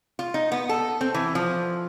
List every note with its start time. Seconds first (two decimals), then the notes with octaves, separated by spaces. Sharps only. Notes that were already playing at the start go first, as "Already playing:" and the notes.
0.19 F4
0.34 D#4
0.52 B3
0.69 A4
1.01 C4
1.14 E3
1.35 F3